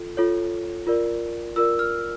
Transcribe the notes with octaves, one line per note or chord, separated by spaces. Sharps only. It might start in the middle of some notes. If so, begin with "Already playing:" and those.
Already playing: F4 A4
F4 A4 C#5
F4 A#4 D5
F4 A#4 D5 E6
F6